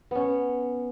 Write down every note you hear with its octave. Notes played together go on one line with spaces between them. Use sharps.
B3 C#4